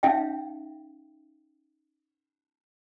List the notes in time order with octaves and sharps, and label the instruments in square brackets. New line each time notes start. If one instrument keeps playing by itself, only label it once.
[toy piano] C#4 D#4 E5 F5 G5